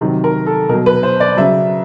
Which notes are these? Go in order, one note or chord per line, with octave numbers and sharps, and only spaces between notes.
C3 D#3 F#3
A#4
A4
B2 F#3 A#4
B4
C5
D5
C#3 F#3 E5